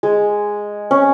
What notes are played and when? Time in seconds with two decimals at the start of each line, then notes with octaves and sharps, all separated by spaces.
0.03 G#3
0.91 C#4